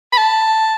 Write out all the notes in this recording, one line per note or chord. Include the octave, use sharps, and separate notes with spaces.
B5
A5